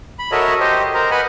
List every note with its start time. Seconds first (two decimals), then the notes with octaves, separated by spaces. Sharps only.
0.19 B5
0.32 F#4 A4 A#4 C#5 D#5 E5
0.60 G4 C5 D#5
0.94 A#4 C5 A#5
1.11 B4 D#5 F#5 G#5 B5